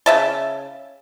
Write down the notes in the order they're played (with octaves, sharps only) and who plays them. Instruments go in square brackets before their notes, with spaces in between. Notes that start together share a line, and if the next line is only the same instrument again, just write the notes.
[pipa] C#3 E5 A5